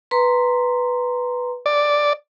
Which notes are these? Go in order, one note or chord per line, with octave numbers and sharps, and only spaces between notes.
B4 A#5 C6
D5